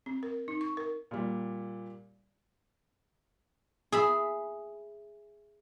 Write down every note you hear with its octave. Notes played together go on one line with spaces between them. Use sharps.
C4
A#4
D#4
C#6
A#4
A#2 G3
G#4 E5 B5